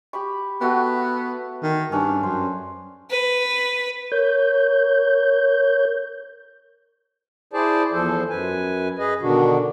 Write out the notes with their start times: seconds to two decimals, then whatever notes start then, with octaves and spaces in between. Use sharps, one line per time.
0.13 G4 B5 C#6
0.61 A3 B3 F#4 G5
1.63 D#3
1.92 G2 C#4 D4
2.23 F#2 C5
3.10 B4
4.12 A#4 C#5 G6
7.53 E4 G#4 C5 D5 A5
7.93 E2 F3 A4 C5
8.29 F#2 B4 G#5
8.99 G#4 B4 D#5
9.22 B2 D3 D#3 D4 F#4